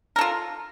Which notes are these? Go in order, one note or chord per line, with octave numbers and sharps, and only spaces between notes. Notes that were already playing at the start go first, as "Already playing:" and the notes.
F4 A4 A#4